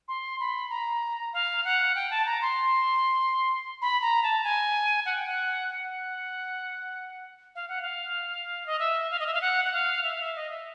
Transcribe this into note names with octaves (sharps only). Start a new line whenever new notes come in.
C6
B5
A#5
F5
F#5
G5
A5
A#5
C6
B5
A#5
A5
G#5
F#5
G5
F#5
F#5
F5
F#5
F5
D#5
E5
F5
D#5
E5
F5
F#5
F#5
F5
E5
F5
E5
D#5
E5